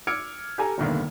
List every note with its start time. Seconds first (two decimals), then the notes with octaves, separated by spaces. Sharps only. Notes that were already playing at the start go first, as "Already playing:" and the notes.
0.07 D6 E6 F6 G#6 C#7 D7
0.58 G4 A4 G#5 A#5
0.78 F1 C2 D3 D#3 A#3 B3